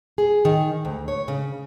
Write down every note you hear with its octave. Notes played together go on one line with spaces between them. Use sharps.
G#4
D#3
D2
C#5
C#3